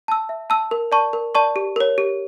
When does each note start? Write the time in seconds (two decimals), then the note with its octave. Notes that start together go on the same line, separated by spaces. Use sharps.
0.08 A5 E6
0.29 E5
0.50 A5 E6
0.71 A#4
0.92 D5 A5 C#6
1.13 A#4
1.35 D5 A5 C#6
1.56 G4
1.76 A#4 C#5
1.98 G4